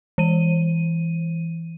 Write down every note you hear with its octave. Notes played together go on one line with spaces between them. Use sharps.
E3 D#7